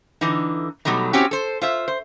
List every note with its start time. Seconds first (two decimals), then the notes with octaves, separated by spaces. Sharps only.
0.21 D3 E3 D#4
0.85 B2 F#3 G3 A3 D#4
1.13 C4 C#4 E4 F#4 G4
1.31 A4 C5
1.61 F4 C5 E5
1.88 C5